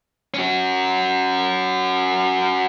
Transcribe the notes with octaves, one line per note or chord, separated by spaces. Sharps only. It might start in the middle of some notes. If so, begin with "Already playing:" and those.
C#4 F#4